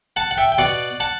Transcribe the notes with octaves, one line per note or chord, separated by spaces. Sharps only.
F#5 A5
F#5
E5 G5
G5
B2 D5 F#5
F#5 A5